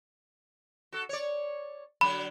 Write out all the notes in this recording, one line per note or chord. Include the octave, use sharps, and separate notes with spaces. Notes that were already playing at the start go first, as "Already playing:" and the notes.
F#4 A4
C#5 D5
D3 F#3 B5